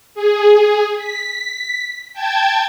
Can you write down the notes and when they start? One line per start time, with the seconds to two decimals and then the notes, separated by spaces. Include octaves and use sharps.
0.15 G#4
0.96 B6
2.14 G5 A5 G#6